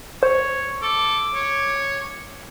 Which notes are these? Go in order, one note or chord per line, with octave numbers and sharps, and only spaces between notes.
C5 C#5
A4 D6
C#5